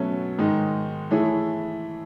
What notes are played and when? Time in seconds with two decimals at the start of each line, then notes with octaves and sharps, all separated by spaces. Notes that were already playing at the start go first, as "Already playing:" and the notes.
Already playing: B2 F#3 A3 C#4
0.38 G#2 D#3 G#3 D#4
1.11 E3 A3 E4 G#4 C#5